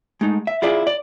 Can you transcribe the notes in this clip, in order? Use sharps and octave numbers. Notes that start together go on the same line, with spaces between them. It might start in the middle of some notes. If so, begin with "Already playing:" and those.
G#3 A3 D#4
E5
E4 F4 G#4 D5 E5
D5